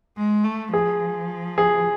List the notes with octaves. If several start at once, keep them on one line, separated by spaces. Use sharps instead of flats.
G#3
A3
F3 G#4
G#4